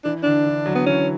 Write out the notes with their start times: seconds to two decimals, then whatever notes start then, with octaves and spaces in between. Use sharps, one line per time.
0.04 E3 D4
0.23 D3 D4
0.46 E3
0.66 D3 F#3
0.75 B3
0.86 E3 C#4